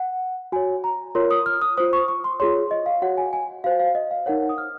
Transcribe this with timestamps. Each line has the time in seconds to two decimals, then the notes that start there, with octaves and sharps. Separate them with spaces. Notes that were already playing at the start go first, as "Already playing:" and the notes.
Already playing: F#5
0.52 F#4 C#5 G#5
0.84 A#5
1.15 F4 A#4 C#5 C6
1.31 D#6
1.46 F6
1.62 D#6
1.77 F4 C5 D#6
1.93 C#6
2.08 C#6
2.24 C6
2.40 F4 G#4 C#5 C6
2.71 D#5
2.86 F5
3.02 F#4 C#5 F#5
3.18 G#5
3.33 G#5
3.64 F#4 C5 F5
3.79 F5
3.95 D#5
4.11 F5
4.26 D#4 A#4 C#5 F#5
4.49 D#6
4.58 F6